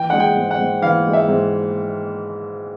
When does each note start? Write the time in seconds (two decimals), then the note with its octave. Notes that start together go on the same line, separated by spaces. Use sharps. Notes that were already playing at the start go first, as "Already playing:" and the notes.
Already playing: E3 G5
0.10 G#3 F#5
0.20 G5
0.36 G#2
0.51 F#5
0.59 G#2
0.82 E3 F5
1.06 G#3
1.13 E5
1.28 G#2